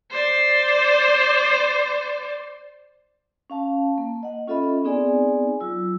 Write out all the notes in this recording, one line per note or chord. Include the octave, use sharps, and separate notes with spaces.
C5 D5
C#4 F5 A5
A#3
D#5 F#5
C#4 F4 A4 D#5 E5 B5
B3 C4 D#4 G#4 D5 G#5
F#3 F4 E6